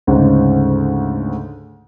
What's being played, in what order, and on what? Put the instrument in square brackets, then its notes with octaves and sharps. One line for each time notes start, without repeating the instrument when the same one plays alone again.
[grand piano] D2 G#2 C#3